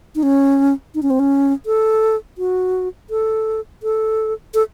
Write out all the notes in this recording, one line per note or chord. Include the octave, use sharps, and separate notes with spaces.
D#4
C#4
D#4
C#4
C4
C#4
A4
F#4
A4
A4
A4